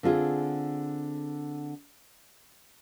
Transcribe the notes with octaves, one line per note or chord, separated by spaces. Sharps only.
D3 C4 F4 G#4